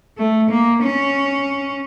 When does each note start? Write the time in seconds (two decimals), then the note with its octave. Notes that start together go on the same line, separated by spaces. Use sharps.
0.18 A3
0.50 A#3
0.83 C#4